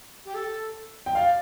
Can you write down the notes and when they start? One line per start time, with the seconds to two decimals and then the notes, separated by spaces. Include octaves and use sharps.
0.25 G4
0.34 A4
1.06 G5
1.15 D5 F5